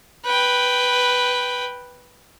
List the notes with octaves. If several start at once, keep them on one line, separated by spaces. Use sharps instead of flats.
B4 G5